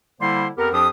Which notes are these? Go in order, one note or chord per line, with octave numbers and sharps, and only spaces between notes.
D3 G3 A#3 E4 C5 C6
F2 B3 G4 A#4
F2 F3 D4 G4 D#6